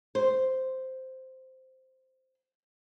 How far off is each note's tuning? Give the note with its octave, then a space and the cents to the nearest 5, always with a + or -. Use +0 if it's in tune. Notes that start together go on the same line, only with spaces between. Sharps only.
C5 -5